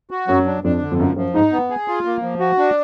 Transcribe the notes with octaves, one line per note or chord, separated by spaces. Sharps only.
F#4
F#2 F#3
D4
F2 D4
D3
F2
F#2 F3
F#2 F3
G#2 D#4
B3
G#4
F4
A#3
F3
F#4
D4